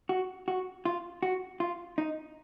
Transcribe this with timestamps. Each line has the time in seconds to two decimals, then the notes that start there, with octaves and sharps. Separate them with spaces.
0.09 F#4
0.48 F#4
0.85 F4
1.23 F#4
1.60 F4
1.98 D#4